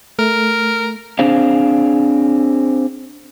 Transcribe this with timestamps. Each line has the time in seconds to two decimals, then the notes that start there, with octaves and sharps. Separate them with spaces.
0.19 A3 A#4
1.19 C4 D4 G#4 C5 F5